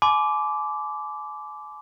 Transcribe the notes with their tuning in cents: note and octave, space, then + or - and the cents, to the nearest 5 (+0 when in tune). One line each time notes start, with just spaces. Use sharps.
G#5 +35 B5 +45 D6 -10